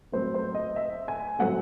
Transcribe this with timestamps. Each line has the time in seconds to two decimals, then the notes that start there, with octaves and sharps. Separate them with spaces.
0.12 A2 F#3 C4 C5
0.34 C5
0.55 D#5
0.76 E5
1.08 G#5
1.39 A2 F#3 A3 C4 F#5